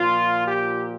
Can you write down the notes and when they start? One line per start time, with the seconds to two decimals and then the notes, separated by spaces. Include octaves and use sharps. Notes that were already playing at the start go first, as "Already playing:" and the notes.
Already playing: A#2 F3 F4
0.47 G4